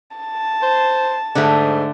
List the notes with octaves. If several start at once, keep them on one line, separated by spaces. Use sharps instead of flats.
A5
C5
G#2 D3 A3